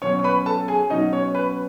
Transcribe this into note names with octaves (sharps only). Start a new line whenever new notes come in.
B2 F#3 C#4 C#5 C#6
C#6
B4 B5
A4 A5
G#4 G#5
B2 F#3 C#4 D#4 D#5
C#5
B4